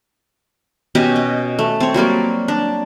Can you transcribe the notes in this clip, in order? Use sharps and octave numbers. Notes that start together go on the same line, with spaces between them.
B2 C#4 G4 D#5
D#5
A3
C4 C#5
F#3 G3 A#3 D5
D4